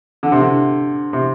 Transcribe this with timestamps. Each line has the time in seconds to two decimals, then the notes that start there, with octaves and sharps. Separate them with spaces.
0.23 D3
0.32 C3
0.40 D3
1.13 C3